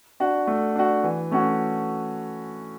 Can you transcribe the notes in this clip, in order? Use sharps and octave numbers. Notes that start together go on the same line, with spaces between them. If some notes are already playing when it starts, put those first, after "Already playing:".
D4 F#4
A3
D4 F#4
E3
A3 C#4 F#4